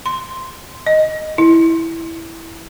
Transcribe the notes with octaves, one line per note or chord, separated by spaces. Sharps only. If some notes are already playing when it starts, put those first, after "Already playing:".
C6
D#5
E4